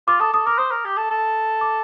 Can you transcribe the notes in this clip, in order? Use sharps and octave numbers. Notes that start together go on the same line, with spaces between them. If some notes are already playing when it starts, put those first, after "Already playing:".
F4 D6
A4 D#6
A4 D#6
A#4 D6
C5 D#6
A#4
G4
A4
A4
D6